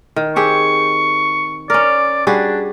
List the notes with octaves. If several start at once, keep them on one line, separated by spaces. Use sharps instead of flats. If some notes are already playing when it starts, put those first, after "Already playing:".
D#3
C4 G4 G#4 C#6
C#4 A#4 D5
G3 D4 F#4 G#4